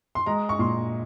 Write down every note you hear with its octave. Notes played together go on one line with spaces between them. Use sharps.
C6
G#3 A#5
C#6
A#2 C6